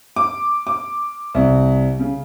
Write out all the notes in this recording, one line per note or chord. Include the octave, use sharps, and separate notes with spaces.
D6
D6
C2
C#3